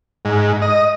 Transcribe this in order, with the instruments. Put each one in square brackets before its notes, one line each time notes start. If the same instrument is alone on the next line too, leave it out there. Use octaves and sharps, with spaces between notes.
[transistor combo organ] G#2
D#5